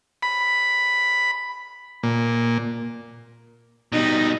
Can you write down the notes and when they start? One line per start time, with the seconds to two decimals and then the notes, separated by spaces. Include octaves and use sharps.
0.23 B5
2.03 A#2
3.92 B2 G3 D#4